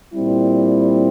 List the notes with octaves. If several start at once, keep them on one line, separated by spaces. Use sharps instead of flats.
A#2 G3 C4 E4